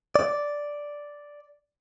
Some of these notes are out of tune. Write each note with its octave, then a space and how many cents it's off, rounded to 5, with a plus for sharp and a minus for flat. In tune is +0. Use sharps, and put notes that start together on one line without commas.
D5 -5